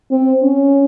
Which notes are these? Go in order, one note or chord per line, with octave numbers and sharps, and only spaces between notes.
C4
C#4